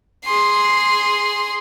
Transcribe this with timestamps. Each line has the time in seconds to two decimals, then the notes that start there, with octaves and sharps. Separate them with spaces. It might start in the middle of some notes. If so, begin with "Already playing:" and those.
0.25 G#4 C6